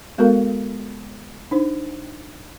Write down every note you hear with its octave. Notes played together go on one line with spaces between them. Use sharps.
G#3 B3 F#4 A4 A#4 F5
D4 D#4 C5